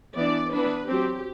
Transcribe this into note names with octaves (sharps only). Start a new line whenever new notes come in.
E3 B3 D4 D5
E3 B3 D4 B4
F#3 C4 G4